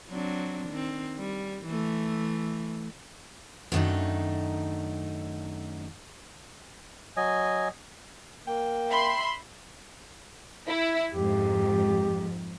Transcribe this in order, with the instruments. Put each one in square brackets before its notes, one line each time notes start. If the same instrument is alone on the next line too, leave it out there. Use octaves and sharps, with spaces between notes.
[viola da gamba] F#3 C4 D4
D#3 C4
G3
E3 A3
[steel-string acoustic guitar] F#2 D#3 A3 A#3 D4 D#4
[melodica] F#3 D#5 G#5
[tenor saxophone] A#3 [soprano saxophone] G5
[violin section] E5 B5 C6
[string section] E4
[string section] F2 G#2 [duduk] G4